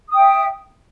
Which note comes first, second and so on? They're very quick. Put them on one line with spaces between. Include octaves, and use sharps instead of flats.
D#6 G5 E5